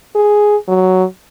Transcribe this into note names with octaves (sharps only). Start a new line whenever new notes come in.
G#4
F#3